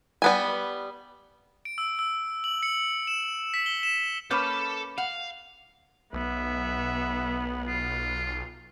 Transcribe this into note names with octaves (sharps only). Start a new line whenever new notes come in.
G3 B3 G#5
D7
E6
E6
F#7
C#7
E7
B6
G7
E7
A#3 C#4 A4 B4 A5 B5 D6 G6
F5 F#5
B1 B3 E5
F4